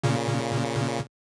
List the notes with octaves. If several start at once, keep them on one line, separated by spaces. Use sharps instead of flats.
A#2 C#3